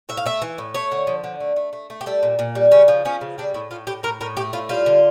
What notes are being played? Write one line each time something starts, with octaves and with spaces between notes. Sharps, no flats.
A2 E5
F5
A3 E5
E3
A2
A3 C#5
D3
F3
D3
A3
A3
A3
A3
G4
G3 A4
A#2
A#2
G3
C#3 C#4
F3
F3 C#4
C#3
G3 D4
A2 E4
A2 F4
A2 G4
A2 A#4
A2 A#4
A3 G4
A2 F4
G3 F4
D3